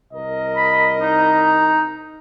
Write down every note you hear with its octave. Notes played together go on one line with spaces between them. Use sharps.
C2 A#4 D#5
B5
D#4